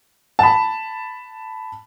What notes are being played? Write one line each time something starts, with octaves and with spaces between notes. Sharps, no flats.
A5 B5